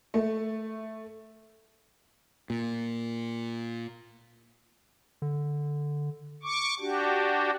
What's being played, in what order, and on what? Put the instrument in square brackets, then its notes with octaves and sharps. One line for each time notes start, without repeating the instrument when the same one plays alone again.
[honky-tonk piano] A3
[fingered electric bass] A#2
[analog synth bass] D3
[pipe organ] C#6 D6
D4 F#4 G4